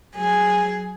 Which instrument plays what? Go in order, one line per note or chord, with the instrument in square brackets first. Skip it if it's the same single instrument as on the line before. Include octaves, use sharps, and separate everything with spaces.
[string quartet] F#3 G#4